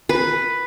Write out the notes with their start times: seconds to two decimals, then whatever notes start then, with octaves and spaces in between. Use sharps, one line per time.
0.09 B4